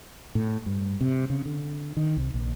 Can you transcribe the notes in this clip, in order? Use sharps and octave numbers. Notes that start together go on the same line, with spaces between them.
A2
G2
C3
C#3
D3
D#3
C2
A#1